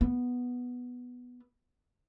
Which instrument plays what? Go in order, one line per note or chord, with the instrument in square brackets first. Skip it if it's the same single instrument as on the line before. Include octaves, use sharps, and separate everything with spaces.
[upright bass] B3